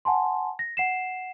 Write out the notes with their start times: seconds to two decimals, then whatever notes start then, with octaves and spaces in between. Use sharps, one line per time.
0.05 F#5 G#5 A5 C6
0.59 A#6
0.77 F#5 C7 E7